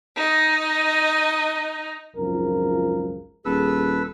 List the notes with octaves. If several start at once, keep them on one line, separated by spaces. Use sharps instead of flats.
D#4 D#5
G#1 C#2 F#2 F3 A#4
D#1 G#4 A4 B4 E6